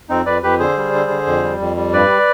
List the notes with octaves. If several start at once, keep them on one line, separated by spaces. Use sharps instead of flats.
F2 C4 D#4
F2 B4 D5
F2 G4 B4
D3 G#4 C5
G3
D3
D3
F2
G3
F2
G3
G2 B4 D5